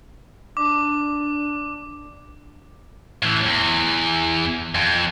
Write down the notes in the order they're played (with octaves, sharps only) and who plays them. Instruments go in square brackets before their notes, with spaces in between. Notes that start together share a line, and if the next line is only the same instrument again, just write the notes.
[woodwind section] D4 [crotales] D6
[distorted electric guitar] A2 E3
E2
F2